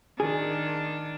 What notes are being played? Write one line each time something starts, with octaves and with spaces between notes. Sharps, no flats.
D#3 D4 G#4